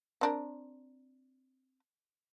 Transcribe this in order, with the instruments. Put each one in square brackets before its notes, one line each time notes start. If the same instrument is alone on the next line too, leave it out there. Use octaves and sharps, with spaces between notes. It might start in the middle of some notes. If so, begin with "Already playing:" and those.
[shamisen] C4 D4 A#4